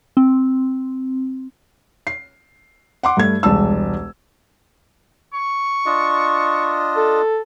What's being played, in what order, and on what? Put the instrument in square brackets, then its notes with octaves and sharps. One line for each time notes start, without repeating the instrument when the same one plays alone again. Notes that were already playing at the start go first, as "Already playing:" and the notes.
[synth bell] C4
[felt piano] C7
F#5 C6 D6
G2 A3 G#6
E1 C2 G#3 A5 E6
[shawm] C#6
[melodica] D4 F4 D#5
[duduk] A4